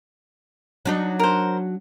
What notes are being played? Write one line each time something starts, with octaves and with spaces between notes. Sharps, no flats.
F#3 D4 D#4
A#4 C5